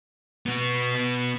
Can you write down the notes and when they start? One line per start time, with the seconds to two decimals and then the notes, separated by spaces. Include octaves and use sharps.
0.46 B2 B3